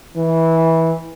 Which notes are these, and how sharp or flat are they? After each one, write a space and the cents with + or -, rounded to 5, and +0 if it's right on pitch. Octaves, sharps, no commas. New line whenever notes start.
E3 -15